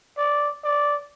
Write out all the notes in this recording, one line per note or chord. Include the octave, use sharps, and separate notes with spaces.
D5
D5